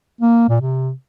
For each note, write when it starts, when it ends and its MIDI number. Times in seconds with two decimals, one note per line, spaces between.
0.21 0.47 58
0.49 0.57 46
0.61 0.91 48